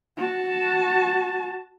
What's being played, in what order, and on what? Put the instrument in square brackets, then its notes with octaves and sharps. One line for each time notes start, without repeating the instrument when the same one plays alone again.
[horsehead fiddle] F#4 A5